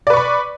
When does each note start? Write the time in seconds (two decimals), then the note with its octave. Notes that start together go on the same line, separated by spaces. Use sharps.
0.07 D5
0.10 B4
0.13 C#6
0.17 B5